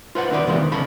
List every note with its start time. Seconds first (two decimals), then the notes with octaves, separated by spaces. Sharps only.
0.15 F4 B4 C5 F#5
0.30 D2 D3 D#3 B4 D5
0.47 E2 C3 E3 G#3 A#3 B3
0.60 D#3
0.71 E2 C#3 C#4 A4 B5